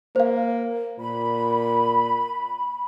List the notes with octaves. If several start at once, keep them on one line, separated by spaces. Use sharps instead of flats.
A#3 C5 F5
A#2 B5